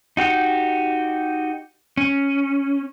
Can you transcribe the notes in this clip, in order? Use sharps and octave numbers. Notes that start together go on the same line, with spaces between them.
D#4 F#4 G4
C#4